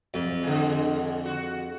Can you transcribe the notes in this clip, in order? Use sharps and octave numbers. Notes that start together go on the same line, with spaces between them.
F2
D3 G#3
F#4